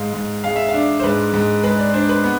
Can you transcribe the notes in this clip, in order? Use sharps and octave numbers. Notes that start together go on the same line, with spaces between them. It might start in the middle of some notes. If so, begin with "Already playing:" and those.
Already playing: G#2 F5
G#2
G#3 F5
E5
F5
D4
C5
G#2 B4
G#2
G#3 B4
D5
D4 C5
B4
B3